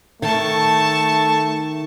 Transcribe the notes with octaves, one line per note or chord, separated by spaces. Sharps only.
D#3 A3 A5 C#6